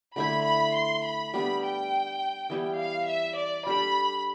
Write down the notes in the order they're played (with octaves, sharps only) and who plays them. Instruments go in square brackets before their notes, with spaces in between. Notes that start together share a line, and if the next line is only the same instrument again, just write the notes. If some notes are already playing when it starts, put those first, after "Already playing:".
[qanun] D3 A3 E4 [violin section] B5
[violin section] B5
C6
B5
[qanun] G3 B3 D4 [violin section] B5
[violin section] G5
[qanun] E3 G3 B3 E4
[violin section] F5
E5
D5
[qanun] G3 D4 A4 [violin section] B5